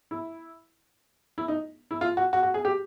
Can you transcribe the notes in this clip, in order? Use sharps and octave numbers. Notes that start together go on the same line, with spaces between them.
E4
E4
D#4
E4
F4
F#4
F#4
F#4
G#4
G4